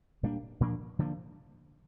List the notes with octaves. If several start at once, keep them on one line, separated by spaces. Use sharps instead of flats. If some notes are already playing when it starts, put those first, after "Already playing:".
A#2 G3 A#3 D4
A#2 F3 A#3 D4
D3 F3 A#3